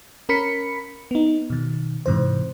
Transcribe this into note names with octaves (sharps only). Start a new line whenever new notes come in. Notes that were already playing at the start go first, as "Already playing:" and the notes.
C#4 A#4 B5 B6 C#7
B3 D#4
B2 D#3
G#2 C3 E3 C5